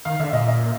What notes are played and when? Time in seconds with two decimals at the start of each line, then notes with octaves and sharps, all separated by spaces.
0.05 D#3 F5
0.20 D3 E5
0.33 A#2 D#5
0.47 D#5